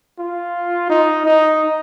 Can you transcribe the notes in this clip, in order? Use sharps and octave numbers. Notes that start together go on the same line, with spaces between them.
F4
D#4
D#4